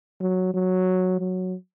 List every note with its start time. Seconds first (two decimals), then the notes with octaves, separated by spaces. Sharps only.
0.20 F#3
0.54 F#3
1.20 F#3